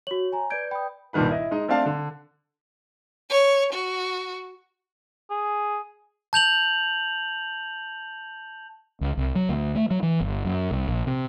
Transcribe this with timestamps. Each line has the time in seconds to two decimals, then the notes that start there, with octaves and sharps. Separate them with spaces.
0.07 F#4 C#5 F#7
0.32 G#5 A#5
0.50 B4 D5 G6 G#6 D7
0.71 G5 B5 D#6
1.13 C2 G2 A#2 D#3 B4 B5
1.29 E4 D#5
1.51 G#3 D#4 D#5
1.68 A3 C4 D4 D5 F5 A5
1.86 D3
3.30 C#5
3.73 F#4
5.30 G#4
6.33 A5 G6 F7 F#7
9.01 C#2
9.17 C2
9.35 F#3
9.49 D2
9.75 A3
9.91 F#3
10.03 E3
10.20 G1
10.45 F#2
10.71 C2
10.87 A#1
11.07 C3